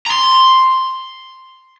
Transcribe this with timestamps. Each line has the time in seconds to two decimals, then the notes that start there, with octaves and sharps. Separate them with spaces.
0.06 A#5 C6